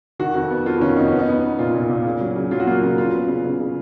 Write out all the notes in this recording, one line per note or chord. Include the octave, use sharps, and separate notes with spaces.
D#3 F#4
F2
B3
F2 F4
D#3 C#4
B3 D#4
B3 C#4
D#4
B3
B3
A#2 F4
A#2
A#2
C#3
F#3
C#3
F#3 F4
F#4
A#3 F4
C#3
C#3 F4
B3
C#3
C#3
C#3